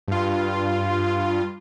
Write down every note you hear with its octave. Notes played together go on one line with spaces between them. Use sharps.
G2 F4